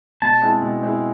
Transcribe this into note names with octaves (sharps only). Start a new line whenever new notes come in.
B2 A5
G#3 C4 E4
B2
G#3 C4 E4